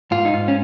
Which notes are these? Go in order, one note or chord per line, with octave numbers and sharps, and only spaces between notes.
G#2 F4
D#4
G#2 F4
C#4